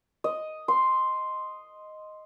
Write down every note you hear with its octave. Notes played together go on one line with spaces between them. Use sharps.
D#5
C6